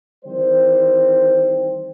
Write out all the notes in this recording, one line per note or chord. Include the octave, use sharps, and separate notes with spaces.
D#3 E3 G3 C4 C5